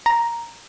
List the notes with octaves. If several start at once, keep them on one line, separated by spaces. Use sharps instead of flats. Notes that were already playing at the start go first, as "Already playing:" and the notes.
A#5